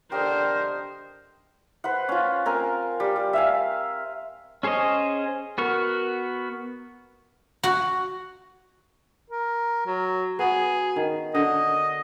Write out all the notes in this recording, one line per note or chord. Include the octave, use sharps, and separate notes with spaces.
D3 G4 A#4 C5 D#5
B4 C5 F#5
C#4 F4
C4 A#4 G#5
G3
G3
E5 F5 G#5
C#4 G#4 C5 C#5 D#5
B3 F#4 A#4 C#6
F#4
A#4
F#3
B3 F#4 G#4
D#3
D3 D#5